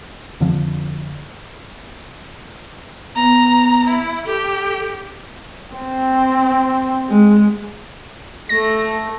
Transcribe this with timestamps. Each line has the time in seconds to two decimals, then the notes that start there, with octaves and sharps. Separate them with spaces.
0.40 F2 D3 F3
3.16 B3 A#5
3.88 E4
4.26 G4 A4
5.75 C4
7.09 G#3
8.49 A3 A#6